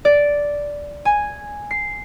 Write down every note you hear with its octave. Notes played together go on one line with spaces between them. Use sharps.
D5
G#5
C7